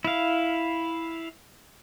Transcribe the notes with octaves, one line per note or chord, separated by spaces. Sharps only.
E4 F5